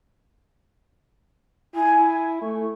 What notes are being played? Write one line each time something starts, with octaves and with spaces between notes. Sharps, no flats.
E4 G#5
A3 C#6